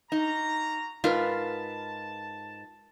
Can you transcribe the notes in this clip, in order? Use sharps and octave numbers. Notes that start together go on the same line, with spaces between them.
A#3 D#4 F#4 A#5
G#2 F4 A#4 B4 A5